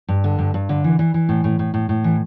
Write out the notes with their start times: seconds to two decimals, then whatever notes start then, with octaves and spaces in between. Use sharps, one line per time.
0.08 G2
0.24 D3
0.39 G2
0.54 G2
0.69 D3
0.84 E3
0.99 E3
1.14 E3
1.29 A2
1.44 A2
1.59 A2
1.74 A2
1.89 A2
2.04 E3